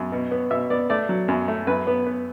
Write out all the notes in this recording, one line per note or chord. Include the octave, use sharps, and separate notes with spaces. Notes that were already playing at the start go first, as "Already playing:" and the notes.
Already playing: F#2
B2
B3
B2 E5
B3 D5
A3 D5
F#3
F#2
A3
F#2 B4
B3
B3